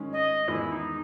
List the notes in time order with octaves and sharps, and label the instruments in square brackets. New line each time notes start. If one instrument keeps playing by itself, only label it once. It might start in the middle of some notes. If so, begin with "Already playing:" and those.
Already playing: [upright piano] D#3 G#3 C#4
[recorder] D#5
[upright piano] E2 D#3 G#3 [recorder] E4
[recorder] D#4